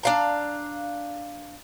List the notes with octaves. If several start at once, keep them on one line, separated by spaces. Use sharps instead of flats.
D4 F5 A#5